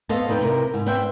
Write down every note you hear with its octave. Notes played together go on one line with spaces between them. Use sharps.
B3 A4 C5 D#5 F5 A5
F2 D#4 B4 G5
C3 E4 A#4
G#2
B4 C5 E5 G5